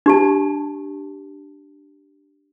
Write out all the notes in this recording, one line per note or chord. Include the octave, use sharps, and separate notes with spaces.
D4 G4 A5